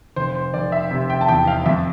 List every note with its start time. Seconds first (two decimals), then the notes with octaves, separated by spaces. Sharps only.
0.16 F1 C5
0.35 C5
0.54 F1 D5
0.72 E5
0.91 C3
1.10 G5
1.21 A5
1.28 E2 G5
1.47 F5
1.66 F2 E5